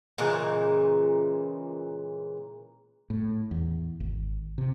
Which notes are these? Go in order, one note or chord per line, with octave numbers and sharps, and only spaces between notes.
A#2 C#3 E3 G#3
A2
E2
G#1
C3